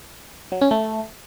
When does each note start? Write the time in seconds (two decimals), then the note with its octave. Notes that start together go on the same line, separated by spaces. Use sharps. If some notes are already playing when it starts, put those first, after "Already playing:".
0.52 F#3
0.61 C#4
0.71 A3